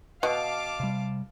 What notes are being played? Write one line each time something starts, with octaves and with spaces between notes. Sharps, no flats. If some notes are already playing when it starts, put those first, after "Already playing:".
B2 F5 A5 D6
C3 G3